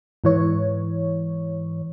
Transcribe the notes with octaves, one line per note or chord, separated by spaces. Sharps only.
G#2 E3 C#5